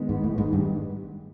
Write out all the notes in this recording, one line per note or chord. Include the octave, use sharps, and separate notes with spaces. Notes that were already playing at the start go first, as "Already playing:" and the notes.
Already playing: D#3 G#3 B3
G#2
A2
G#2
G2